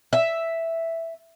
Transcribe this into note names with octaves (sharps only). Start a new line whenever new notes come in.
E5